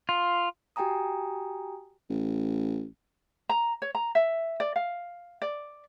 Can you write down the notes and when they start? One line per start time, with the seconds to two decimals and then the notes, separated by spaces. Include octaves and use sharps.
0.09 F4
0.76 F#4 G4 G5 G#5 A#5 D#6
2.10 A1
3.49 A#5
3.82 C#5
3.95 A#5
4.15 E5
4.60 D5
4.76 F5
5.42 D5